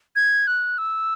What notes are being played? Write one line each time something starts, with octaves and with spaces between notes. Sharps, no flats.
G#6
F#6
E6